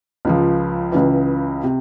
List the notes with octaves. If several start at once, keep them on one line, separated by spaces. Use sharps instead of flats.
C#2 C#3 F3
C#2 C#3 E3
C3